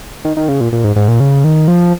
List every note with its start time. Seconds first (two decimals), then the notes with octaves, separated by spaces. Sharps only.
0.25 D#3
0.37 D#3
0.49 C#3
0.61 A#2
0.72 A#2
0.84 G#2
0.96 G#2
1.08 A#2
1.20 C#3
1.44 D#3
1.68 F3